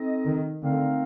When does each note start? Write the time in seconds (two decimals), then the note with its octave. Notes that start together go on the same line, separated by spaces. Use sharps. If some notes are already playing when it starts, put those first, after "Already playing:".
Already playing: C4 D#4 A4 D#5
0.25 D#3
0.61 D3 A3 C4 D#4 A#4 F5